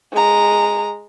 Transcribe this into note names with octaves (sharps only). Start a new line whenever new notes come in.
G#3 A#5